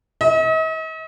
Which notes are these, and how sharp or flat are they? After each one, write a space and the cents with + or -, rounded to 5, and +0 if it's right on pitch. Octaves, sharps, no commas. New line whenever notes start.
D#5 +45